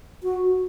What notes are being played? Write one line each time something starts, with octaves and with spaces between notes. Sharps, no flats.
F#4